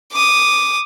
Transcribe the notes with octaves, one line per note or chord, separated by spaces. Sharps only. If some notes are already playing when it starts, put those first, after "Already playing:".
D6 D#6